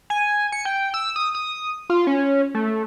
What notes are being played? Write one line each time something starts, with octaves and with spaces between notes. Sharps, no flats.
G#5
C#7
G5
E6
D#6
D#6
F4
C#4
A3